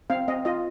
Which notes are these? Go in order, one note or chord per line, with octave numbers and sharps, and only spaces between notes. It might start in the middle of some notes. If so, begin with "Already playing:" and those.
C4 F5
C4 D#5
F4 D#5